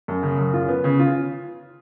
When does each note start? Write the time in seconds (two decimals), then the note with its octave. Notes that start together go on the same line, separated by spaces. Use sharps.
0.08 F#2
0.23 C#3
0.38 F#2
0.54 F4
0.68 B3
0.84 C#3
0.99 F4